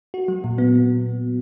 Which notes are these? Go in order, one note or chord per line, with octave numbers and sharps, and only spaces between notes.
F#4
F#3
A#2
B3